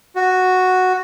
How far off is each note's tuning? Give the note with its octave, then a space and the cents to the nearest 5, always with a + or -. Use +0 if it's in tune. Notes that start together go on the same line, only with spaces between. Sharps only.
F#4 -5